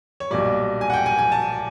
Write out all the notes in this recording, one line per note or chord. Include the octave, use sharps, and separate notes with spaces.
C#5
B1 A#2 G3 D5
G#5
F#5
G5
G#5
G#5
A5